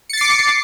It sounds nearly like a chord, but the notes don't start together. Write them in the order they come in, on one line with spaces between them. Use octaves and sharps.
C#7 A6 C7 D6